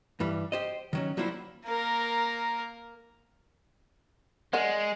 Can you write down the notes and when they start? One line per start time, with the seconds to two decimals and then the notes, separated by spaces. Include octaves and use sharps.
0.20 G2 E3 G3
0.52 G4 C5 D#5
0.93 D#3 F#3 C#4
1.17 F#3 G3 A#3 E4 F4 C5
1.66 A#3 A#4
4.53 G#3 A#4 D5 F#5